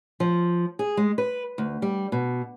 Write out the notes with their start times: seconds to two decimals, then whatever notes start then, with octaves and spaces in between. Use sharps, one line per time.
0.20 F3
0.79 G#4
0.97 G#3
1.18 B4
1.58 D2
1.82 G3
2.12 B2